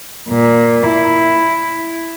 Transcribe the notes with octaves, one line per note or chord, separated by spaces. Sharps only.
A#2
E4